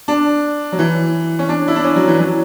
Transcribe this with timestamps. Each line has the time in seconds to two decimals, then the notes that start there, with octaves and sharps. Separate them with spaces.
0.08 D4
0.72 F#3
0.79 E3
1.39 C#4
1.49 D4
1.68 E4
1.76 D4
1.84 C#4
1.96 F#3
2.08 E3
2.20 F#3